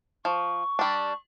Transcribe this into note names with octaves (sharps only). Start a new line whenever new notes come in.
F3 C#6
G3 D4